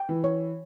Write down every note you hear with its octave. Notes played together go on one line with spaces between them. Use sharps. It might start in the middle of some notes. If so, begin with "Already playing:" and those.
Already playing: G5
E3
C#5